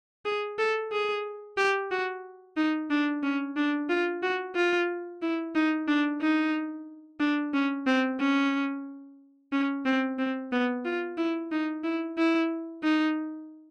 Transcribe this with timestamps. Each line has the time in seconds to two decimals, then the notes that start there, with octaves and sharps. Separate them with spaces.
0.25 G#4
0.59 A4
0.92 G#4
1.57 G4
1.91 F#4
2.57 D#4
2.90 D4
3.23 C#4
3.56 D4
3.89 F4
4.22 F#4
4.56 F4
5.22 E4
5.55 D#4
5.88 D4
6.21 D#4
7.20 D4
7.54 C#4
7.87 C4
8.20 C#4
9.53 C#4
9.86 C4
10.19 C4
10.52 B3
10.85 F4
11.18 E4
11.52 D#4
11.84 E4
12.18 E4
12.83 D#4